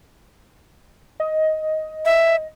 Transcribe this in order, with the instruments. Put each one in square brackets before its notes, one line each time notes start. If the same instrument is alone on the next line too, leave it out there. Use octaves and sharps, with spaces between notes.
[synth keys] D#5
[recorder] E5